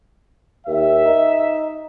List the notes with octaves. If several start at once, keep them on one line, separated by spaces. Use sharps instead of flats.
D#2 E5
D#4